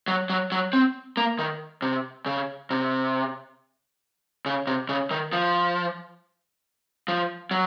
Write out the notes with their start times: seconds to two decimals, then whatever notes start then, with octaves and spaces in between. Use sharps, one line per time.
0.08 F#3
0.30 F#3
0.52 F#3
0.73 C4
1.17 A#3
1.39 D#3
1.82 C3
2.26 C#3
2.70 C3
4.46 C#3
4.67 C3
4.89 C#3
5.11 D#3
5.33 F3
7.08 F3
7.51 F#3